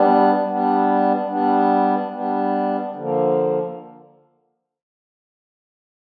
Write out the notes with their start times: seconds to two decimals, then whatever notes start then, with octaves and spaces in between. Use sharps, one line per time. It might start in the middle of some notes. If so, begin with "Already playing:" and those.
Already playing: G3 B3 D4
0.47 G3 B3 D4
1.28 G3 B3 D4
2.11 G3 B3 D4
2.92 D3 F3 A#3